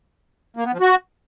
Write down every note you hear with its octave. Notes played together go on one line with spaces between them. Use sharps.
A#3
B3
F3
F#4